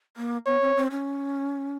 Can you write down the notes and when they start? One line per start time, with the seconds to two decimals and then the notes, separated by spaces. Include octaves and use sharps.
0.17 A#3
0.47 B3 C#5
0.61 C4
0.77 C4
0.91 C#4